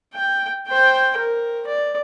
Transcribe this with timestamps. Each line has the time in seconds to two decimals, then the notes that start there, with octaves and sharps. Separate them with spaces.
0.14 G5
0.68 C5 G5
1.17 A#4
1.67 D5